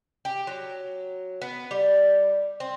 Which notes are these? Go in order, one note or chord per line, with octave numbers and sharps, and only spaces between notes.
G4
F#3
B3
G3
C4